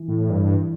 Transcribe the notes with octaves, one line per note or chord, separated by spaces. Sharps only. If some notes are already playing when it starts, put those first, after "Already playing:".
Already playing: E3
A2
G2